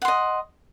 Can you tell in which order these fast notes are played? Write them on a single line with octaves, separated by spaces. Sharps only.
F#5 C6 D#5